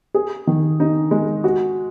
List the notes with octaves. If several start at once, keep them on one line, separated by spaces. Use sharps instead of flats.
G#4
D#3
D#4
G#3
F#4